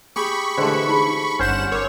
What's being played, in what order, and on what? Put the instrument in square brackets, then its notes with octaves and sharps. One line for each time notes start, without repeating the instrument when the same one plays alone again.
[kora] G4 G#4 [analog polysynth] B5 C#6
[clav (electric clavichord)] D3 E3 [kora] G#3 A3 [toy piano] G4 C5
[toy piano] D#4 F4 G#4
[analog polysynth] G1 F#5 E7 [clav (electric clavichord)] C#4 C5
[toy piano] A#4 D6 [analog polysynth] C#5